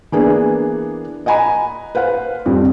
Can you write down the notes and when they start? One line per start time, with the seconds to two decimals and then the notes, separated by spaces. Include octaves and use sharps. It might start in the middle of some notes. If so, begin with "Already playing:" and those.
0.12 E3 A#3 B3 D4 G#4
1.26 D#5 F#5 G#5 A#5 B5
1.95 B4 C5 F5 F#5
2.46 F2 G3 C4